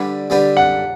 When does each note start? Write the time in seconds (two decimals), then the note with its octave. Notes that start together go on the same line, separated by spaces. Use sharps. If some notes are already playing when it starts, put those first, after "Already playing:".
Already playing: D3 G3 D4 G4 B4
0.30 D3 G3 D4 G4 B4
0.57 F#5